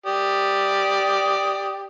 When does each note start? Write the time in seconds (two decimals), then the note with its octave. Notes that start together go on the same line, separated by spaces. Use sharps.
0.06 G4 D5 D#6